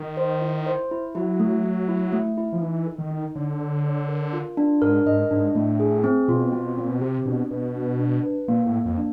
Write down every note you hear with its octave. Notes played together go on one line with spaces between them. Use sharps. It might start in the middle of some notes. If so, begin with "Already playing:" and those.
Already playing: D#3
C5
E4
C5
E4
F#3 E4
A3
A3
E4
A3
E4
F3
E3 D#4
A4
D#3
D#4
D3 C#5
C#5
C#5
A#4
F4
D4
G#2 A#4
G#2 D#5
G#2 D4
A2 A3
G#4
C4
B2 F4
C4
A#2 C4
B2
C3 G4
B2 D4
B2 B4
D4
D4
B4
A#2 A#3
A2
A#3
F2
D4